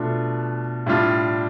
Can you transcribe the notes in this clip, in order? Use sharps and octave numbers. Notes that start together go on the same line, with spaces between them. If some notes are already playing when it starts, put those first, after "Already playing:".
Already playing: B2 A3 D4 F4
A2 G3 D4 F4